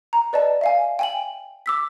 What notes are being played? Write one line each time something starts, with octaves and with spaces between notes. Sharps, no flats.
A#5
B4 D5 D#5 A5
E5 F5 G#5
G5 G#5 F#7
D6 E6 B6